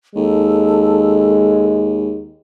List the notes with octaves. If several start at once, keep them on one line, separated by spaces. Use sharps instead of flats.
D#2 G#3 A4